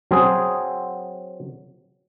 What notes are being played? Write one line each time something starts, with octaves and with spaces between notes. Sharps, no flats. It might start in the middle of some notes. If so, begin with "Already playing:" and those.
F#3 C4 G#4